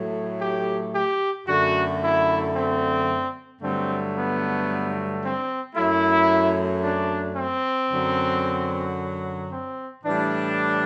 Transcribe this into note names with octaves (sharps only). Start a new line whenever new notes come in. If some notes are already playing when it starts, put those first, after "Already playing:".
Already playing: A2 F#3 A3
G4
G4
F#2 D3 A3 F#4
E4
C4
G2 D3 F#3 A3 C4
B3
C4
F#2 F#3 A3 E4
D4
C4
F#2 D3 F#3
C4
A2 E3 G3 D4